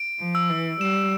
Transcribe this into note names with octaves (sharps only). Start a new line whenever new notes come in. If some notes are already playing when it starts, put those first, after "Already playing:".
Already playing: D7
F3
E6
E3
G3 E7